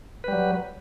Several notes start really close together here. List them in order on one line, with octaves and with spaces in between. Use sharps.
B4 G3 F#3